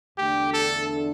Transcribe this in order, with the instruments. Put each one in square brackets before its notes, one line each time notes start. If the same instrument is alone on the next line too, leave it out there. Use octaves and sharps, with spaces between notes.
[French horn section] E2 D3 A3 D4 [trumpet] G4
[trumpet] A4